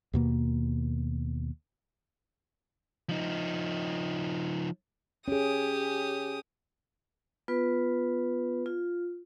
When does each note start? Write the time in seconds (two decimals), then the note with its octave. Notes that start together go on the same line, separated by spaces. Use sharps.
0.13 D#2 B2 A#3
3.09 F3 D#4
5.28 C#4 G4 G#4 D#6
7.48 B3 F4 B4
8.66 F4